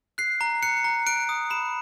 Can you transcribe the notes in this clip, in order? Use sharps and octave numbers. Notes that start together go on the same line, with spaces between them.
F#6 C7
A#5
F#6 C#7
A#5
F#6 D7
D#6
B5 E7